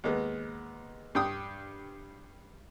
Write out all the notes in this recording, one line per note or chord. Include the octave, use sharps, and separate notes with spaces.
D#2 G#3 B3
G2 G5 D#6